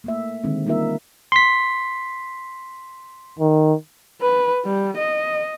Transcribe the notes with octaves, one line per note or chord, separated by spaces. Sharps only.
A3 A#3 E5
D3 D#3 G#3 C4
G3 A#3 D#4 F4 A#4 E5
C6 B6
D#3
B4
G3
D#5